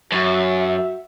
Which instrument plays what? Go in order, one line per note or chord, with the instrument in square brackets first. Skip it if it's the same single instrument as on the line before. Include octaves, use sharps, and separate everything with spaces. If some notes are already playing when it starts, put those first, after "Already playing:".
[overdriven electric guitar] F#2 [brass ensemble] F#4 E5